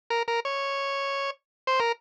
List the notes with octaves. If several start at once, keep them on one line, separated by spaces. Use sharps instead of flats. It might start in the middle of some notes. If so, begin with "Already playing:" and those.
A#4
A#4
C#5
C5
A#4